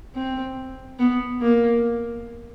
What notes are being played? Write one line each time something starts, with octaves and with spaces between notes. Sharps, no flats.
C4
B3
A#3